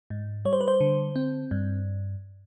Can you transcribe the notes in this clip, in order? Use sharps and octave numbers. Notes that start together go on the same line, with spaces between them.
G#2
G3 C#5
C5
B4
C5
D3
C4
G2